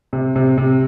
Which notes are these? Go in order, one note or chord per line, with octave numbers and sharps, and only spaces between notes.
C3
C3
C3